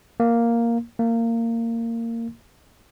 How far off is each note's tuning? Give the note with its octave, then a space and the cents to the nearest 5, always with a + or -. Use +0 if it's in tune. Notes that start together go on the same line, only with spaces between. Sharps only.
A#3 +0
A#3 -20